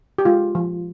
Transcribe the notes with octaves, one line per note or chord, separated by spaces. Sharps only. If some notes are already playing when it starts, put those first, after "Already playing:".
G4
G#3 F4
F3